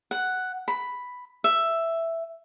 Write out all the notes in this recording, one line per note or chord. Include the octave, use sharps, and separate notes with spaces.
F#5
B5
E5